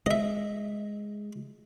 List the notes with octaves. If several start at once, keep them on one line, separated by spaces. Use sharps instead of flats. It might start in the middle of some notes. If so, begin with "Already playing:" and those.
G#3 D#5 E5